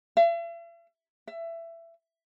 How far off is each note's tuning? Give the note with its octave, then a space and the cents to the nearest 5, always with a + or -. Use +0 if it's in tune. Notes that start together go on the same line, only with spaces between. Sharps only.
E5 +45
E5 +20